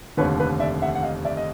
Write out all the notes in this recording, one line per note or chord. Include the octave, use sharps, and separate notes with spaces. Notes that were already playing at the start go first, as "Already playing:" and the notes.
F1 D#2 D3 B4 C#5
B4
D5 E5
E5 F#5
F#5
D#5 F5
D5 E5
D#5